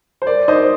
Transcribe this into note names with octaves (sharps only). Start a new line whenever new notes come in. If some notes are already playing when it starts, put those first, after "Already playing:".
C5
A#4 D5
D#4 C5 D#5